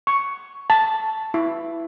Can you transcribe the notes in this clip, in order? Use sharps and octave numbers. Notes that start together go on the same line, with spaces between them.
C#6
A5
E4